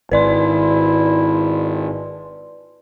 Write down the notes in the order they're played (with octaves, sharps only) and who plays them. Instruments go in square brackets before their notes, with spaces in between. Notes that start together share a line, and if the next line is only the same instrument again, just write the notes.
[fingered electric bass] G#1 [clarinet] E4 [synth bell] B4 D5 C6